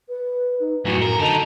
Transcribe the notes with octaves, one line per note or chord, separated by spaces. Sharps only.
B4
D#4
F#2 A2 F#4
A#4
D3 D#4 A5